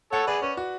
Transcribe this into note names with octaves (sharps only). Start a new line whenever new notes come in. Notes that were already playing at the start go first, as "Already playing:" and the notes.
A4 C#5 F#5
G#4 B4 D5
C#4 B4
F#4